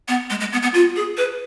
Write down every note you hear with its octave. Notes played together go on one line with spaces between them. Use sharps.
B3
G#3
G#3
B3
B3
F4
G#4
B4